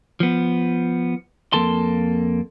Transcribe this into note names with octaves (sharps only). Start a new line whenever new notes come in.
F3 B3
F2 A#3 A4 A5 C6